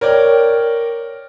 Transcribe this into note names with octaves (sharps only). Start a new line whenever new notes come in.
A#4 C#5 D5 G5